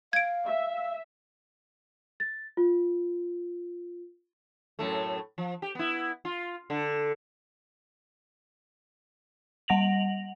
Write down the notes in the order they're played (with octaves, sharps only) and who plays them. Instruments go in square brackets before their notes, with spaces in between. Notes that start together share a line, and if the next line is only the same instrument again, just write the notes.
[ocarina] F5 [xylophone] G#6 D7
[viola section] E5
[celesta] A6
F4
[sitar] F#2 A2 A3
F3
G4
B3 E4
F4
D3
[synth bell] G3 F#5 A#6 F7 F#7